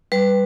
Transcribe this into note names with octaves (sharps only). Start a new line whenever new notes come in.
G3 B4